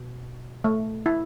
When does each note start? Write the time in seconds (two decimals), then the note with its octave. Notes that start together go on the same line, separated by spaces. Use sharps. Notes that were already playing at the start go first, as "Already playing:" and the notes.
Already playing: B2
0.64 A3
1.06 E4